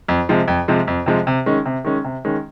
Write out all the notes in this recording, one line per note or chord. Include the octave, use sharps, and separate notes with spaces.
F2
C3 F3 G#3
F2
C3 F3 G#3
F2
C3 F3 G#3
C3
D#3 G#3 C#4
C3
D#3 G#3 C#4
C3
D#3 G#3 C#4